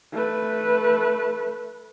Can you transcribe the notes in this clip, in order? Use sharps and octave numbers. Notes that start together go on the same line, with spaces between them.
A3 B4